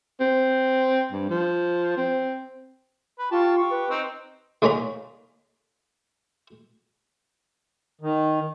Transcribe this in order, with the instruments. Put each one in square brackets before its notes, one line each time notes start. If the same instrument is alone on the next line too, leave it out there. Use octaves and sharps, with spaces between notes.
[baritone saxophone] C4
G2
F3
C4
[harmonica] B4
[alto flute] F4 [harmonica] G4 A5 C#6
[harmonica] G4 C#6
[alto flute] B4
[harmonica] C4 D#4
[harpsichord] D2 G#3 A#3 C#4 A#5 B5
[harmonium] D#3